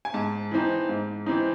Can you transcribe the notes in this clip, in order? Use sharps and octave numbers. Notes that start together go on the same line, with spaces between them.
G#5
G#2 A5
E3 C4 D#4
G#2
E3 C4 D#4